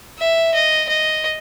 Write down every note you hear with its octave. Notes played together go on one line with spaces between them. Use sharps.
E5
D#5
D#5